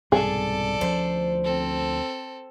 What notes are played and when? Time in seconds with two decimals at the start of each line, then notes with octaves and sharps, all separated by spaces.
0.12 C2 G#2 B2 G#4 A4 D5
0.81 D2 F3 C#4 C5
1.44 C4 A4